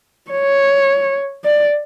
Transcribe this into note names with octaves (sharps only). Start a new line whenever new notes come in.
C#5
D5